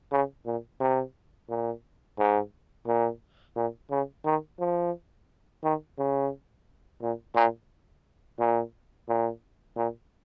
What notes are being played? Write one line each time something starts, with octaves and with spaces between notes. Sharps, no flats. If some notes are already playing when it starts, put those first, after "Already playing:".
C#3
A#2
C3
A#2
G#2
A#2
A#2
C#3
D#3
F3
D#3
C#3
A#2
A#2
A#2
A#2
A#2